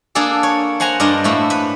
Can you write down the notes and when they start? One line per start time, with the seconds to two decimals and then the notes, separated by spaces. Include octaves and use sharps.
0.15 A#3 D4 G#4 A4
0.43 C#5
0.80 C5 F#5 G#5 A#5
1.00 G2 D4 A#4 C5 D#5
1.24 A2 A3 A#3 B5
1.50 B4